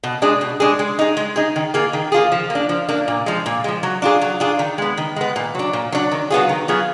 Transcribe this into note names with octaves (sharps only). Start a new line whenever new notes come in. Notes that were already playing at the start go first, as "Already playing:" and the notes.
B2
G#3 D4 G#4
B2
G#3 D4 G#4
G#3
D#4 G#4
G#3
D#4 G#4
D#3
A#3 F4 G#4
D#3
A#3 F4 G#4
F3
A#3
D4
F3
A#3 D4
A#2
F3 G#3
A#2
F3 G#3
F#3
D4 F4 G#4
F#3
D4 F4 G#4
D#3
G#3 B3
D#3
G#3 B3
A#2
F#3 D4
A#2
F#3 D4
D#3
F#3 B3 F4 G#4
D#3
F#3 B3 F4 G#4